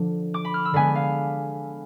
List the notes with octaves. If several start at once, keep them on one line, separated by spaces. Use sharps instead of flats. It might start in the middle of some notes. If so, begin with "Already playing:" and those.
Already playing: D3 F3
D6
B5
F6
E6
D3 G#3 B3 G#5
F5